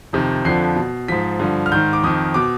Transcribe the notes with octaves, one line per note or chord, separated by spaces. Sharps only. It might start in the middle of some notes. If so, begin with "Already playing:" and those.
F2 C3 D#3
F2 D3 F3 C7
B2
G#2 F3 B6
G2 D3 F3
F6
G#2 D#3 G6
D6
F2 D#3 D#6
B2 D6